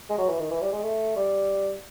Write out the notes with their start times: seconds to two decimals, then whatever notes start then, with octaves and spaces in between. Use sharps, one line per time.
0.10 G#3
0.18 F#3
0.29 E3
0.40 D#3
0.51 E3
0.62 G3
0.72 G#3
0.83 A3
1.16 G3